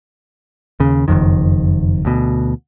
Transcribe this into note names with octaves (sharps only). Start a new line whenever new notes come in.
D#2 C#3
F#1 B1 F2 D#3
D2 B2